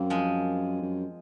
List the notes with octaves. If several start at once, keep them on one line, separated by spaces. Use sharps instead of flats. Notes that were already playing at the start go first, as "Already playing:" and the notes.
Already playing: F#2 A#3 C4
F3 G#3
F#2